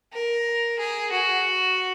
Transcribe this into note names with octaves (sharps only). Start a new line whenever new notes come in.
A#4
G#4
F#4